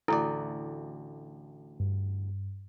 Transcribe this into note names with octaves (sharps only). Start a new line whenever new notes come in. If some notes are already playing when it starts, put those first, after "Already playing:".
A1 D2 E4 A4 D5
G2